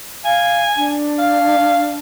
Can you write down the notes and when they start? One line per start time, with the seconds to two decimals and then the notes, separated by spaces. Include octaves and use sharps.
0.24 F5 G#5
0.77 D4
1.19 F5